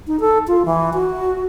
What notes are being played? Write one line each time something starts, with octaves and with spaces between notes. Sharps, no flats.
D#4
A4
F4
E3
F#4